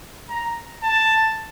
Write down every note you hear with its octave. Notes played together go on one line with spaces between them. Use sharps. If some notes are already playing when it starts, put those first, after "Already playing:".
A#5
A5